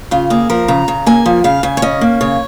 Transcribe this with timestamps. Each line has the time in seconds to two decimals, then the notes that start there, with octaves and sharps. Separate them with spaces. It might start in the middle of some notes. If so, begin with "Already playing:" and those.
0.11 C#3 F4
0.30 A#3 G#4
0.50 F3 A#4
0.68 C#3 A#5
0.88 C#3
1.06 A#3 G#5
1.26 F3
1.44 C#3 F5
1.63 C#3 G#5
1.77 C#5
1.82 C#4 D#5
2.01 A#3
2.21 C#3 C#5